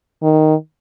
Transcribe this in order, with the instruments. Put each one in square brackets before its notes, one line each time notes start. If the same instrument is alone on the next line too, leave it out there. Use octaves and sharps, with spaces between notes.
[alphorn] D#3